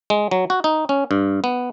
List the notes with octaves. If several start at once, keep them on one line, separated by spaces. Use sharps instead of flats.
G#3
F#3
F#4
D#4
C#4
G2
B3